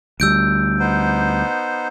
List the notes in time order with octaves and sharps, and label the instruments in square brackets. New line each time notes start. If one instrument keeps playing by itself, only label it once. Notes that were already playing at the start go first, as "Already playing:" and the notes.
[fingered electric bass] D2 G3 [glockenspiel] E6 G6 D7
[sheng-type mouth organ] B3 D#4 C5